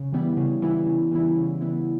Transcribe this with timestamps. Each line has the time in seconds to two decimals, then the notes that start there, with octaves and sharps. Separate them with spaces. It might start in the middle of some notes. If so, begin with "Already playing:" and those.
Already playing: C#3
0.13 E3 G3 B3 E4
0.37 C#3
0.62 E3 G3 B3 E4
0.86 C#3
1.11 E3 G3 B3 E4
1.36 C#3
1.61 E3 G3 B3 E4